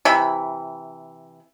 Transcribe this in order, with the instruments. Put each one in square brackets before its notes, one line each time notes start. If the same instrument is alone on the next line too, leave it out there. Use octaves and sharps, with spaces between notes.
[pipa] C3 E3 B5